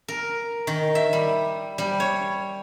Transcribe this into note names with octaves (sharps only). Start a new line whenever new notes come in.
A#4
D#3
E5
G3
G3
C#5